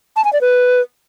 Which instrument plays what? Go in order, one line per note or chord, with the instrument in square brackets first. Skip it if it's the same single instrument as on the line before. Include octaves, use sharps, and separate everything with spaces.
[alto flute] A5
G#5
D5
B4